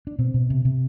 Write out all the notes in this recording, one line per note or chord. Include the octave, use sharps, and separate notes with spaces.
D4
B2 C4
B2
C3
C3